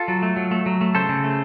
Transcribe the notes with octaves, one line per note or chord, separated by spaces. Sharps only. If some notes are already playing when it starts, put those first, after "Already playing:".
Already playing: F4 A4
F#3
A3
F#3
A3
F#3
A3
C#3 A4 C5
C#3
A3